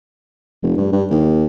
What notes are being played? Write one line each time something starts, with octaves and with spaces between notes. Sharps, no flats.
F1
G2
G2
D#2